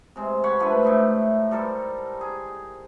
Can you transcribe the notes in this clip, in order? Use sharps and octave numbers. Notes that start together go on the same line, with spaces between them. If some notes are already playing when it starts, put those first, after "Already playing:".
C3 G#3
C#5 F#5 B5 C6
F3 A3 D4 B4
A2 D#4 E5
G3 A4 A#4 C5
G#4